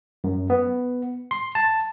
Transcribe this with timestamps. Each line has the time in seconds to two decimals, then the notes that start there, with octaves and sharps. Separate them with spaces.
0.24 F#2
0.50 B3
1.31 C6
1.55 A5